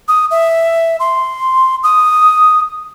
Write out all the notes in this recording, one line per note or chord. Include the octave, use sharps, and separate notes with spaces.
D#6
E5
C6
D#6